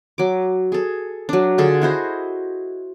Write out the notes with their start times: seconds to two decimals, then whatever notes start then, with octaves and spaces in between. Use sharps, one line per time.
0.18 F#3 D6
0.72 G#4 A4
1.29 F#3 D4
1.58 D3 F4 G#4 A4
1.82 E4 F#4 C5 D#5